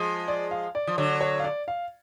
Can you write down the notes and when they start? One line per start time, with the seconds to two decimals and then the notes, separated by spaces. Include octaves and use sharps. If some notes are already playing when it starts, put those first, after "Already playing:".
Already playing: F3 G#3
0.28 D5
0.51 F5
0.75 D5
0.87 F3
0.98 D3 F#3 C#5
1.21 C#5
1.39 F5
1.44 D5
1.68 F5